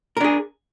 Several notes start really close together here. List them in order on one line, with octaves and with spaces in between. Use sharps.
A#4 D4 G#4